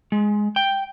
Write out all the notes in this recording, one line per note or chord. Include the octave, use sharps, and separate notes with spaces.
G#3
G5